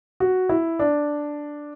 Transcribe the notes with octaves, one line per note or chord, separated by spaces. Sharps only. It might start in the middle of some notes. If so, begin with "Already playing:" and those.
F#4
E4
D4